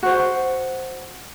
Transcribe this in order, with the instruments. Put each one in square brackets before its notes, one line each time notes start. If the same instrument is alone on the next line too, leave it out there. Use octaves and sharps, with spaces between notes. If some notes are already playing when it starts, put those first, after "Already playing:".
[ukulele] F#4 C5